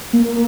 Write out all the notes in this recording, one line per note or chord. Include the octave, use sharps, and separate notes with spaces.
A#3